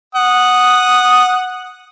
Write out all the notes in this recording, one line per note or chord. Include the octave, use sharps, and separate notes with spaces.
F#5 D#6